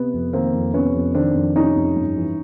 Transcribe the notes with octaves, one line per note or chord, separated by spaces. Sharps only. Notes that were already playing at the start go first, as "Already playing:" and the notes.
Already playing: C3 B3
F2
D#3 A#3 C4
F2
C3 B3 C#4
F2
D#3 C4 D4
F2
C3 C#4 D#4
F2
G2
E3